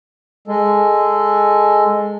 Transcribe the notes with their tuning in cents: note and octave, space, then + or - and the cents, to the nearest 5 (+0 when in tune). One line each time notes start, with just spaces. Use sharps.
G#3 +0 A4 +0